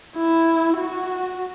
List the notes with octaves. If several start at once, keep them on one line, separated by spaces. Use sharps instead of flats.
E4
F#4